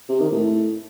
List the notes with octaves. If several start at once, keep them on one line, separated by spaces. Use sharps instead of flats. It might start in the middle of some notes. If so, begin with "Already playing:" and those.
C3
D#3
A2